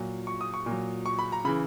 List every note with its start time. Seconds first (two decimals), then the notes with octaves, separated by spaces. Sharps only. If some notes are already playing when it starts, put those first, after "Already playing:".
Already playing: A#2 F#3
0.27 C#6
0.41 D#6
0.54 C#6
0.66 A#2 F#3
1.06 C#6
1.19 B5
1.32 A#5
1.45 C#3 E3 B5